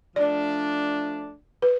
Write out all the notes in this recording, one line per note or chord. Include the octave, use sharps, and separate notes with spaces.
F3 A3 D4 D5
B4